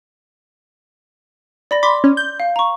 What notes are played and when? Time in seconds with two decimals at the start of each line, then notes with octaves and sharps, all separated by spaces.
1.71 D5 B5 A#6
1.83 B5 C6 D6
2.04 C#4
2.17 G6
2.40 F5
2.56 A#5 C#6